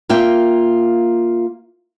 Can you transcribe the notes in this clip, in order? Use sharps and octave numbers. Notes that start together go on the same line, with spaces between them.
A#3 F4 E5 G5